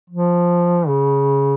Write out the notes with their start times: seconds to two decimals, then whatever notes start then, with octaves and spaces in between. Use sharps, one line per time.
0.10 F3
0.88 C#3